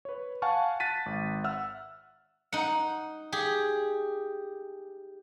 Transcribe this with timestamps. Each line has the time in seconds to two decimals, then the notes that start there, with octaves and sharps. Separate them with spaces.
0.05 B4 C#5
0.42 F5 F#5 G#5 A5 C#6 F6
0.80 A5 F#6 A6 B6 D#7
1.06 G#1
1.44 E5 F#5 E6 F6
2.53 D#4 F#5
3.32 G4 G#4